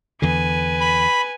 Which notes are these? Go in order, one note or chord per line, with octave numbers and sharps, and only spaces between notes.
E2 D3 B4 G#5
B5